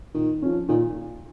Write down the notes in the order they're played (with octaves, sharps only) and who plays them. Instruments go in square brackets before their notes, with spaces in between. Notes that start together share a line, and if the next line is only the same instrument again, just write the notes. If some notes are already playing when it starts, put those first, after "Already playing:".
[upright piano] A#2 [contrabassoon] D#3
[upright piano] F3 C#4
[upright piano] A#2 [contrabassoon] D#3